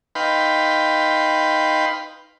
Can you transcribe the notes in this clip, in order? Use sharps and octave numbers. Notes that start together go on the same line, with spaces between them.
D#4 B4 F5 G5 B5 C6